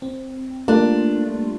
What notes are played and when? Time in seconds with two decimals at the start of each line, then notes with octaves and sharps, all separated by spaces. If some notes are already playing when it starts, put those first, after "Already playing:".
0.02 C4
0.68 G3 A3 A#3 D4 F4